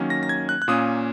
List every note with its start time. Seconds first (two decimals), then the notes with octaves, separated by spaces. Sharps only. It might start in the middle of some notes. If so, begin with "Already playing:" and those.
Already playing: D#3 F#3 A#3 C#4
0.10 A#6
0.23 A#6
0.29 G#6
0.49 F#6
0.62 F#6
0.68 A#2 A#3 C#4 D#6